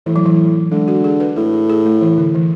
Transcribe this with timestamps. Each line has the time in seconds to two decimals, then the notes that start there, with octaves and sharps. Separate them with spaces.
0.06 A2 E3
0.16 F#3
0.26 E3
0.71 D3 G#3
0.88 F#4
1.04 G#4
1.20 B4
1.36 A2 A4
1.53 G#4
1.70 G#4
1.85 A3
2.01 E3
2.18 D3
2.35 E3